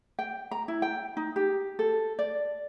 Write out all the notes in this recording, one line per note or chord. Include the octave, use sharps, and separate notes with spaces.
G5
A#5
E4
G5
D#4
G4
A4
D5